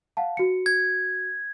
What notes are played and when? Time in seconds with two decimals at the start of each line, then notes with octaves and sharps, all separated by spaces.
0.17 F5 F#5 A5
0.37 F#4 C#7
0.66 G#6